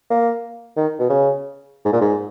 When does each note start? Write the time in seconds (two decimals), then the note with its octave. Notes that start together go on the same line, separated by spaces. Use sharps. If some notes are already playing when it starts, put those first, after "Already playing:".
0.10 A#3
0.77 D#3
0.99 B2
1.10 C#3
1.85 G#2
1.93 A#2
2.01 G#2